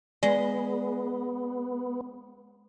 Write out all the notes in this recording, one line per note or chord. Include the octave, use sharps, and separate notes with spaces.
G#3 B3 D5